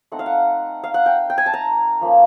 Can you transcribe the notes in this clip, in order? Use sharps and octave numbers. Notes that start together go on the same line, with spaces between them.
A3 C4 D#4 F#5
F5
F#5
F5
F#5
G5
G5
G#5
A5
A#5
F3 A#3 C#4